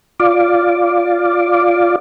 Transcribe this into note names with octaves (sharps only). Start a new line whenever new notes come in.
F4 D5